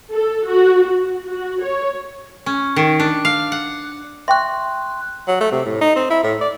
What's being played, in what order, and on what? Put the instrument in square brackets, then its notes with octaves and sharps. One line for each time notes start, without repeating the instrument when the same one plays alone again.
[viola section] A4
F#4
F#4
F#4
C#5
[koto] C#4
D#3
D4
F5
F#5
[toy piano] E5 G5 C#6 [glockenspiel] C6 F#6
[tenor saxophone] F#3
A3
C3
A2
D#4
C4
E4
A2
D5